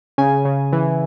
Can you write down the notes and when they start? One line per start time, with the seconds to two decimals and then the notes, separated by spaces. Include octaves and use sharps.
0.18 C#3 G#5
0.45 C#3
0.72 E3